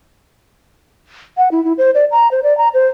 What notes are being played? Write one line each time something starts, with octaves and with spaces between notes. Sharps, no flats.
F#5
E4
E4
C5
D5
A#5
C5
D5
A#5
C5